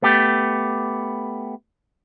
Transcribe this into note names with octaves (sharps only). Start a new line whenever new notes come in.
A3 B3 G4